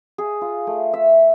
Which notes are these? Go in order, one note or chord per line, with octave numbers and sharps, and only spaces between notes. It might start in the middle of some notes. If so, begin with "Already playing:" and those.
G#4
F4
A3
E5